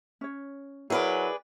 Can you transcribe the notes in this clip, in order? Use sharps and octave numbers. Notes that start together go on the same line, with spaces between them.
C#4 C#5
F#3 E4 G#4 A#4 B4 D5 G#5